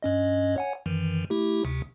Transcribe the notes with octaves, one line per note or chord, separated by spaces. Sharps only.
G2 C#4 D#5
C#5 F#5 G#5
F#2 D#3 E3
A3 E4 G4
D2 C3